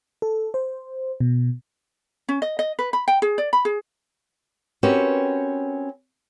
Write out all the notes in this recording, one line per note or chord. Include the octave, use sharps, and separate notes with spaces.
A4
C5
B2
C#4
D#5
D#5
B4
B5
G5
G#4
D5
B5
G#4
C4 C#4 F#4 G4 A#4 B4